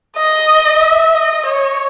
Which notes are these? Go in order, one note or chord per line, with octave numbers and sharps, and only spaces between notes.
D#5
E5
D#5
C#5